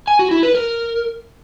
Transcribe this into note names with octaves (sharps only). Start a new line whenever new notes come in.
G#5
F#4
E4
B4
A#4